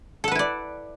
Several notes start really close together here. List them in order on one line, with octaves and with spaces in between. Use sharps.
A4 F#5 B4 E4 D5